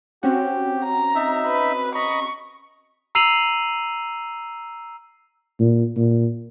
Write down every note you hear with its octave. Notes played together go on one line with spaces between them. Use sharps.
C4 C#4 F#4 G4
A#5
D#4 E5
B4
D#5 A#5 B5 C#6
A#5 E6 C7 D#7 F7 F#7
A#2
A#2